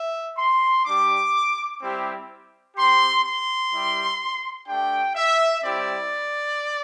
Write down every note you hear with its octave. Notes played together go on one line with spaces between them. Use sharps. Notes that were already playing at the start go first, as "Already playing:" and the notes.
Already playing: E5
C6
G3 D4 G4 D6
G3 C4 E4 G4
C4 G4 C6
C6
G3 E4 G4
A3 D4 G4 G5
E5
G3 C4 E4 G4 D5